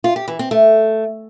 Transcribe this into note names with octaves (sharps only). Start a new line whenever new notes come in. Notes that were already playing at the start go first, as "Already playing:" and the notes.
F4
G4
E3
C4
A3